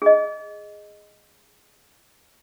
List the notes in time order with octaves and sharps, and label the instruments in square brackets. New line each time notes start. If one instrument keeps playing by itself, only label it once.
[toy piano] G#4 D#5